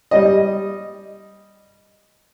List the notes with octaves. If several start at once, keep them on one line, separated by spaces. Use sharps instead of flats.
G3 D#5